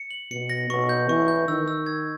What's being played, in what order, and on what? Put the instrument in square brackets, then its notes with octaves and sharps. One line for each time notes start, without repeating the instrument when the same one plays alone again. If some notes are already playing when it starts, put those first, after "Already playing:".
Already playing: [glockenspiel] C#7
F#7
[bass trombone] B2 [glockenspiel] C#7
[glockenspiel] A#6
[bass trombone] B2 [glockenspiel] C#6
[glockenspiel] G6
[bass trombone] E3 [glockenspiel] C#6
[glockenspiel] G6
[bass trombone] D#3 [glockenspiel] E6
[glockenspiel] E6
G#6